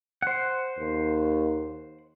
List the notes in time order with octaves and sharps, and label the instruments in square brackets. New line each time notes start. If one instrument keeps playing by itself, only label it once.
[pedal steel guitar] C5 F#5
[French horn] D#2